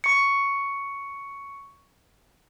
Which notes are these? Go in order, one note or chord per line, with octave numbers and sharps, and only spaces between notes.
C#6 C#7